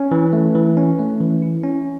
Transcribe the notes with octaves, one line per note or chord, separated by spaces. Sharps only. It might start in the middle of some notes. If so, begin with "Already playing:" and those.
Already playing: C#4
E3
A3
E3
C#4
A3
E3
E4
C#4